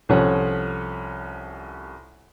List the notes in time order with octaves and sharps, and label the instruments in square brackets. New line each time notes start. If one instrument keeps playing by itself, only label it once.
[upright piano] C2 F3 C#4 A4 C#5 F#5